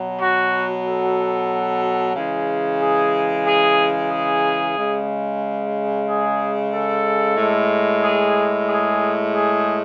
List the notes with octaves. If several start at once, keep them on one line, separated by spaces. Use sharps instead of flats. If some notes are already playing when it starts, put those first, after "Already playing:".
Already playing: B2 F#3
F#4
A4
C#3 E3 G#3
G#4
G#4
G#4
C#3 G#3
G#4
A4
A2 G#3
G#4
G#4
G#4